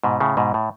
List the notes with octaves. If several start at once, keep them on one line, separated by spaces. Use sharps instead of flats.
G#2 B2
A2 C#3
G#2 B2
A2